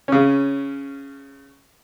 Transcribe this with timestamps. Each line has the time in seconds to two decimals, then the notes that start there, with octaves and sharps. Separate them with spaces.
0.08 C#3 C#4